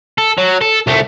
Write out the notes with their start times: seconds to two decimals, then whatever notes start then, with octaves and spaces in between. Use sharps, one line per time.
0.18 A4
0.38 F#3
0.62 A4
0.87 C2 A3